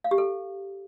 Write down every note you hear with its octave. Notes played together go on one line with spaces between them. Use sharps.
F5
G4
A4